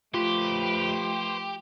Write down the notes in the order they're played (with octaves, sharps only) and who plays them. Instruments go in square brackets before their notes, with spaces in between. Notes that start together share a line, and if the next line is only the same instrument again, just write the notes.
[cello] F3 A3 [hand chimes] F4 [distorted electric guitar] G4 [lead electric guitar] B4 C5